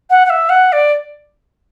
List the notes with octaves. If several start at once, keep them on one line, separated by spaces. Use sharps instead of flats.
F#5
F#5
E5
F#5
D5